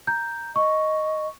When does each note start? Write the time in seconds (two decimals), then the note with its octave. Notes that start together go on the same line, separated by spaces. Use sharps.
0.07 A#5 G6
0.56 D#5 C#6